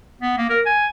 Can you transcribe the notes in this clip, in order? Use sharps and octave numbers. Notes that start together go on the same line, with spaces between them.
B3
A#3
A#4
G#5